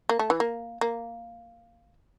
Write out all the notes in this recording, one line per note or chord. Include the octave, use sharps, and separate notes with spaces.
A#3
A3
E3
A#3
A#3